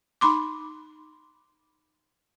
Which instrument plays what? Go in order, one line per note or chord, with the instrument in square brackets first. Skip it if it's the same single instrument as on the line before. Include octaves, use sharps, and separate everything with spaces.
[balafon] D#4 B5 C6 D6